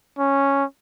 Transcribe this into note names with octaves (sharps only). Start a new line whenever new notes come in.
C#4